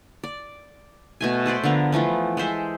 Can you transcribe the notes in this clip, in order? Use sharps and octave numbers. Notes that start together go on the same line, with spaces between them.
D5
B2 A3 G#5
A4 B4 C5 D5
D3 F3 B3 A#4
E3 F3 A3 B3
G#3 A4 C5 E5